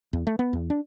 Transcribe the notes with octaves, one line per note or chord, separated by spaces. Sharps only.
E2
A3
B3
E2
D4